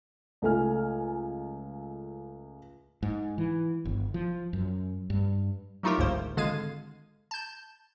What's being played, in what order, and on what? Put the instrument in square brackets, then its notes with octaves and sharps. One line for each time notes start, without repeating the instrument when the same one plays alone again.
[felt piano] C#2 A3 A4 G#5 F6
[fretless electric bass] G#2
E3
G1
F3
F#2
G2
[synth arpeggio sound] F#3 A3 D#4 F4 G4 A#4
G1 C#2 G#2 A#3 C5
G#1 D3 G#3 F5 G#6 D#7
A5 G6